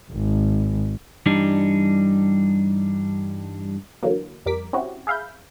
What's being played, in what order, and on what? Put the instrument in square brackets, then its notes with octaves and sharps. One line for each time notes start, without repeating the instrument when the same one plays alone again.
[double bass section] G#1
[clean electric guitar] G2 E3 G3 D4 D#4
[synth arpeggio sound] D3 E3 F#3 A#3
F2 G3 A#4 D6 B6
C4 C#4 E4 F#4 G4
G#4 E5 F5 B5 G6